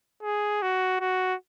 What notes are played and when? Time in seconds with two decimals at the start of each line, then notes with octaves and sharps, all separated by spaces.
0.23 G#4
0.62 F#4
1.00 F#4